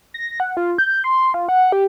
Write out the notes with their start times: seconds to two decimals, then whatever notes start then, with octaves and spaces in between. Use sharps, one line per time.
0.14 A#6
0.40 F#5
0.57 F4
0.78 G6
1.04 C6
1.34 F4
1.48 F#5
1.72 G4